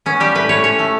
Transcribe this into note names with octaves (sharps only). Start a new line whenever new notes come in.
B3 C#4
G3 G4
A2 B4
A2 C#5
C#4 C#5
A3